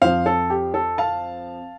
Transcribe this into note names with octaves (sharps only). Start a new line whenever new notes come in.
F2 F3 C5 F5
A4
G4
A4
F5 A5